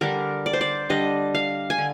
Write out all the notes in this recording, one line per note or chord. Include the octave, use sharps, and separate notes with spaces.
D3 G3 D4 A#4
D5
C5
D5
D3 G3 D4 D#5
F5
G#5
D3